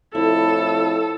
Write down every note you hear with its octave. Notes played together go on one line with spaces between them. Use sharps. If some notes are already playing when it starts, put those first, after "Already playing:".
F2 A2 E4 A4